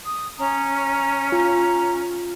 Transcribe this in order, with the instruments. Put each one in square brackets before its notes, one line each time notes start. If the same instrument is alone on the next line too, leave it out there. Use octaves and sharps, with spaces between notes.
[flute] D#6
[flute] C#4 [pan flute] A#5
[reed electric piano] F4 [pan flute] A#5